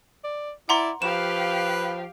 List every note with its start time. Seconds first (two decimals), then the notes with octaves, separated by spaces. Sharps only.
0.24 D5
0.69 E4 D5 F#5 A#5 C6
1.02 F3 G4 B4 F5 E7